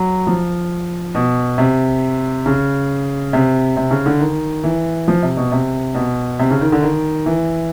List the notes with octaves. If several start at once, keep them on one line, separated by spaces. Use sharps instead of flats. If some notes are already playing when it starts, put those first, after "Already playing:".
Already playing: F#3
F3
B2
C3
C#3
C3
C3
C#3
D3
D#3
E3
F3
C3
B2
C3
B2
C3
C#3
D#3
D3
D#3
E3